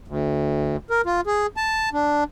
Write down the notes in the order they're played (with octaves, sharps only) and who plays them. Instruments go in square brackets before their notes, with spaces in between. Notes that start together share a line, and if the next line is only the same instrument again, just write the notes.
[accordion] D2
A#4
F4
G#4
A5
D4